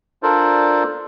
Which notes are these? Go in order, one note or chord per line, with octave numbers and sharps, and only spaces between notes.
D4 F4 A4 A#4 C5 D5